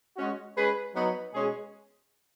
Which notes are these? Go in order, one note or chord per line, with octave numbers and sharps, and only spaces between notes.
G#3 C#4 F#4
G#3 C#4 G#4 B4
F#3 B3 D#4
B2 G#3 C#4 G#4